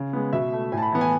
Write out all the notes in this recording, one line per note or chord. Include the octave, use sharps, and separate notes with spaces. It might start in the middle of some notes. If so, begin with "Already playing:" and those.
Already playing: C#3
G#3 B3
B2 E5
A3
A2 G#5
A5
B5
E3 B3
G#5